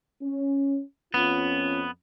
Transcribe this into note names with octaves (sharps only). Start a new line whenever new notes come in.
C#4
F2 B3 C#4 F4